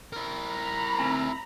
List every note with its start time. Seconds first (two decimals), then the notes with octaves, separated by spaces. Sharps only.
0.13 E4 A#4
0.48 A#5 B5
0.99 D2 C4 G#5